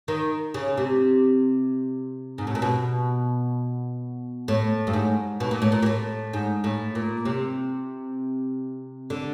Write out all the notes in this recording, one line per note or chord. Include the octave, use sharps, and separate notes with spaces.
D#3
C#3
C3
G#2
A2
A#2
B2
A2
G2
G#2
B2
A#2
A2
A#2
A#2
A2
G#2
A2
A#2
C3
D3